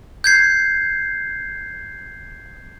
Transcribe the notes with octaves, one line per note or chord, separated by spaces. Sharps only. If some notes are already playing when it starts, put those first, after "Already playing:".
G6 G#6 C7